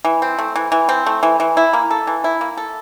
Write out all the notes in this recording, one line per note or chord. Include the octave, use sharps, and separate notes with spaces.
E3
C4
A3
E3
E3
C4
A3
E3
E3
E4
A#3
A4
E3
E4
A#3
A4